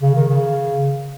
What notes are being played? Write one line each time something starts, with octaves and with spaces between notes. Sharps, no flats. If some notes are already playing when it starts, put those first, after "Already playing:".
C#3
D#3
C#3